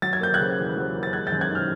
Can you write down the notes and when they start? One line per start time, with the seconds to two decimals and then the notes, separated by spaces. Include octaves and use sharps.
0.02 F#3 A6
0.13 G#6
0.21 A#3 G6
0.34 F#6 G#6
0.39 C#3
0.58 E2
0.77 F#3
0.95 A#3
1.03 A6
1.13 G#3 F#6 G#6
1.27 G6 A6
1.32 F#2
1.41 F#6 G#6
1.51 D#3 F6 G6